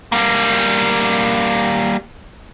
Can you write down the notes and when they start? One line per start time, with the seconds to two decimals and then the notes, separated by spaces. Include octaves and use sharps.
0.12 G3 A#3